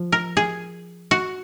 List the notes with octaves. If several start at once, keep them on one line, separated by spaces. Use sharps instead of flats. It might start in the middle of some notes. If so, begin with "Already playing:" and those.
Already playing: F3
A#4
G#4
F#4